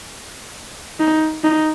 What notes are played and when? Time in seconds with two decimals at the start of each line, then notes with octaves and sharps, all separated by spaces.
1.00 D#4
1.43 D#4